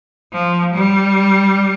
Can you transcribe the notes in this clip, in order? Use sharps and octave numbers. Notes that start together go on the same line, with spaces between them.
F3
G3